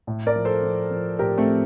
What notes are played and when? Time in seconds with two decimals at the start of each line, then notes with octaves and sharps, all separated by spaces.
0.07 A2
0.27 A#4 D5
0.36 F3
0.45 A4 C5
0.63 F3
0.91 F3
1.19 A2 G4 A#4
1.38 A3 C4
1.47 F3